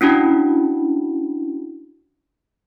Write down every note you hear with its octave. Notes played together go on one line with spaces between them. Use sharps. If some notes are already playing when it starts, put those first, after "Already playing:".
C#4 D4 E4 F#4